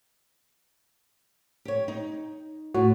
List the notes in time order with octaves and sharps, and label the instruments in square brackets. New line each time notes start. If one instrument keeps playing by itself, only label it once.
[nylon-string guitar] G4 C#5
D#4
[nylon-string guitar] A2 [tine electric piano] F#4